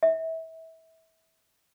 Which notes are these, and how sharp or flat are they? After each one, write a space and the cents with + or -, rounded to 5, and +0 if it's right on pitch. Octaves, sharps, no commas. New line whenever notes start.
E5 -25